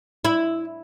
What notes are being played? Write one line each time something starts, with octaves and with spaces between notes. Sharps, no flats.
E4